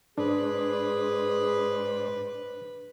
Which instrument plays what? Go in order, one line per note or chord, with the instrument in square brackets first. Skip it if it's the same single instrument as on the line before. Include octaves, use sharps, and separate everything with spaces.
[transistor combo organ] G#2 C5 D5 [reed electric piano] D4 [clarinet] G#4 [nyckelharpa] B4